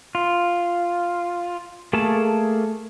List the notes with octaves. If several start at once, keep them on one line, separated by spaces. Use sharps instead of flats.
F4
A3 A#3 G#4 A4 A5